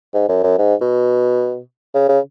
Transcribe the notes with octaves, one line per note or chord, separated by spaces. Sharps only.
G#2
F#2
F#2
G#2
B2
C#3
C#3